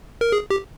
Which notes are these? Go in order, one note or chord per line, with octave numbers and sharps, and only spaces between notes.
A#4
G#4
G4